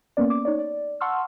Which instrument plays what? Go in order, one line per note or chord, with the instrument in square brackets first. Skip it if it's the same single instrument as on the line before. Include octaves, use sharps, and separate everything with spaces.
[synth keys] A#3 B3 C#4 D5
D6
D#4 C#5 D5
D5
F#5 A5 C6 C#6 E6 F6